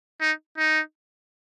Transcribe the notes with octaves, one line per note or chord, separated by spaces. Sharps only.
D#4
D#4